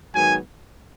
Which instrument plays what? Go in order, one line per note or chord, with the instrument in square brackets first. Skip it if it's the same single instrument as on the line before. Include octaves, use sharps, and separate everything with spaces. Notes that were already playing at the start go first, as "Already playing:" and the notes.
[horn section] G#2 D#3 F#3 B3 G#5